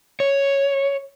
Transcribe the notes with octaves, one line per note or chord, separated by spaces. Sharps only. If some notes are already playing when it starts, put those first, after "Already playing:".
C#5